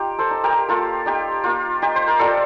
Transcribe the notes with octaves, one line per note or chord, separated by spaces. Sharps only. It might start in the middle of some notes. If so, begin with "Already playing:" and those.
Already playing: D#4 F4 G4
A4 C5
D#4
G4 A#4
A#3 F4 A4
D#4 G4
A#3 F4
D#4 G4
C5
A#4
G3 F4 A4